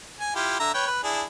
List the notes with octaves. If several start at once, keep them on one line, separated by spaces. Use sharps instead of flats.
G#5
E4 F4 G4
D3 E5 A#5
B4 C#5 G5
B4
D4 E4 G#4